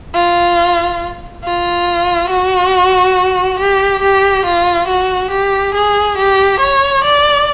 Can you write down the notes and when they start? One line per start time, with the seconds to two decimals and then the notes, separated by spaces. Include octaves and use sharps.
0.15 F4
1.44 F4
2.30 F#4
3.60 G4
4.02 G4
4.46 F4
4.88 F#4
5.31 G4
5.74 G#4
6.18 G4
6.60 C#5
7.04 D5